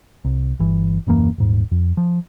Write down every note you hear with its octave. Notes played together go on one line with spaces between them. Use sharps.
C2
G1 E3
D#1 F#2 E3 A#3
D#1 G#2
F2
F3